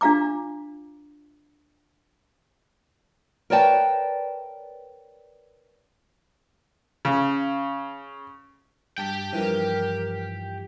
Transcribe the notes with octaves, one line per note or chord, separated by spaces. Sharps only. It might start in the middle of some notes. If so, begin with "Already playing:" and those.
D4 F4 F5 A#5 D6
A#4 B4 C#5 D5 G5 A5
C#3
G2 G4 G5 A5
G2 E3 F3 A#4